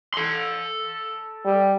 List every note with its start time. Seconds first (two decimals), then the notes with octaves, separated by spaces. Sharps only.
0.14 A4 C6
1.45 G3